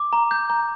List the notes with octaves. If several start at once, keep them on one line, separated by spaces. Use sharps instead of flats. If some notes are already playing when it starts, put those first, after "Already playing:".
Already playing: D6
A#5
G6
A#5